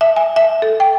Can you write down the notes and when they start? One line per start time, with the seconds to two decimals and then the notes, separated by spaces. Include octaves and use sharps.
0.01 E5
0.16 G#5
0.36 E5
0.62 A4
0.80 G5